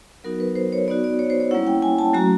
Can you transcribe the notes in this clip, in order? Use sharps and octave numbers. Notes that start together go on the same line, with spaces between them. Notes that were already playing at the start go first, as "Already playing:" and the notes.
F#3 B3 D#4 F#4 A#4
B4
C5
C#5
B3 D#4 F#4 D5
D5
C#5
C5
C#5
G3 A#3 C#4 E4 F#5
G5
G#5
A5
F#3 A3 C#4 F#4 A#5